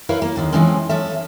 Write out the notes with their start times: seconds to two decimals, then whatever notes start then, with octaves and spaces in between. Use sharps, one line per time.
0.09 E4 A#4 B4 C#5 E5 F5
0.22 A#3
0.36 D#2 D3 D#3
0.52 E3 F3 G#3 C4 C#4
0.89 F3 C#4 A4 E5